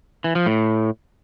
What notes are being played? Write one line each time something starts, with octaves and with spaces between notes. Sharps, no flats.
E3
F3
A2